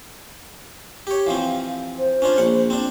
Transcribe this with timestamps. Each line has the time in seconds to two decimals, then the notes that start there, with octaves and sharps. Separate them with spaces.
1.07 G4 C#5
1.27 E3 F3 C4 F5
1.99 C5
2.22 C#4 D4 F4
2.38 A#1 F#5
2.70 C4 D4